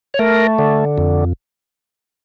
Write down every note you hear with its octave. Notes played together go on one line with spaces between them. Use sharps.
C#5
A3 A#4
D3
F2